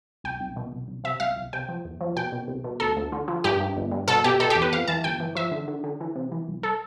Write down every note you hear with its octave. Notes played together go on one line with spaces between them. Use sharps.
C2 G5
C2
B2
C2
C2
C3 E5
C2 F5
C2
C3 G5
F3
E2
F3
B2 G5
B2
C2
B2
D2 A4
D2
D3
F3
G2 G4
G2
G1
G2
B2 A4
B2 G4
B2 A4
G4
E2
B4
F2 F5
E3 A5
G1 G5
E3
F3 E5
D3
D3
D3
E3
C3
E3
C2
A4